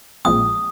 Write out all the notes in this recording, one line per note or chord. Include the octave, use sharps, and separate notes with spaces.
A#1 A#2 F3 G#3 C4 D#6